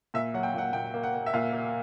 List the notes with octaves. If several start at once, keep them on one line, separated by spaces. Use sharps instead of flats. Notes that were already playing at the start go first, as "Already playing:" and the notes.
A#2 E5
F#3 F#5
G5
A#2 F#5
A#2 G5
A#3
F#5
A#3
E5
A#2 F5
A#3